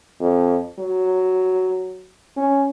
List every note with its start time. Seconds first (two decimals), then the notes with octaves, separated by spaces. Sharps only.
0.20 F2
0.79 F#3
2.37 C#4